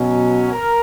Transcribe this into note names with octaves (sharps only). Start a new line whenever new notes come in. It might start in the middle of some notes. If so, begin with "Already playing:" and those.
Already playing: B2 F#3 C#4
A#4